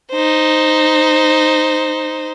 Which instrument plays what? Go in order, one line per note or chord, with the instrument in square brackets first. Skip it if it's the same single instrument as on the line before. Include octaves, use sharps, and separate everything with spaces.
[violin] D#4 C5